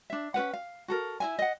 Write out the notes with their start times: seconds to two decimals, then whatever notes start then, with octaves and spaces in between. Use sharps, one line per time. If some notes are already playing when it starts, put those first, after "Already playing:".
0.10 D4 E5
0.34 C#4 F4 B4 F#5
0.53 F5
0.88 F#4 A4 A#4
1.20 E4 E5 G#5
1.39 D#5 F#5